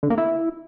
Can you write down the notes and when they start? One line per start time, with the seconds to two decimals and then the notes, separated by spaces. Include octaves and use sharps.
0.03 D3
0.10 A#3
0.18 E4